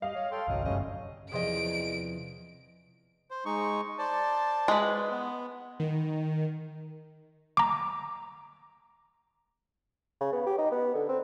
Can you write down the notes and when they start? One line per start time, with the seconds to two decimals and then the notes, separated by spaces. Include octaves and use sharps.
0.02 G3 D#5 F5
0.15 C#5
0.32 A4 C#5 G5 C6
0.48 G1 C2 F#3 D#5
0.65 G1 F#2 G3 A3 C#4 D#5
1.32 E2 C3 F3 G#4 D5 D#5 D7
3.31 C5
3.45 G#3 D#4 C#6
3.99 C5 D5 A5
4.68 G#3 B4
5.11 B3
5.80 D#3
7.57 A#5 D6
10.21 C#3
10.32 B3
10.47 G4
10.58 D#4
10.71 B3
10.95 D3
11.09 C4